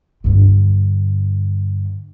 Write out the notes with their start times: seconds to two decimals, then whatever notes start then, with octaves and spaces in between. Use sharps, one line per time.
0.24 G2 D3